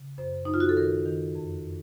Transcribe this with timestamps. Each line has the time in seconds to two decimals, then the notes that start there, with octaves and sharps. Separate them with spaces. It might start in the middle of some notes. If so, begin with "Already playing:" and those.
Already playing: C#3
0.18 F#2 C5
0.45 F#2 D#4
0.54 F4
0.60 F#4
0.69 A4
0.76 D#3 A#4
1.06 D#3
1.35 F2